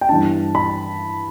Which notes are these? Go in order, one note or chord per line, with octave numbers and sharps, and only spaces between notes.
G5
G2 E3 B3 D4 A5
B5